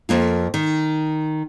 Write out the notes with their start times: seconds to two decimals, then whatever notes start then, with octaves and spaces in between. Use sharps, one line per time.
0.09 F2 A#3 F4
0.54 D#3